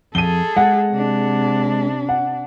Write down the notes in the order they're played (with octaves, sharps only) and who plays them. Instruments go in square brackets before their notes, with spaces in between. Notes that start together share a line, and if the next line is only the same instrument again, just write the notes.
[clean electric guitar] F2 [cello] G#4 A4 [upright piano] D#7 G7
[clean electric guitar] G#3 [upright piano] F#5
[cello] C3 D4
[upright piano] F#5